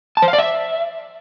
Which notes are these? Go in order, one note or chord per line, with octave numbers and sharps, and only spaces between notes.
A5
C5
F5
D5
E5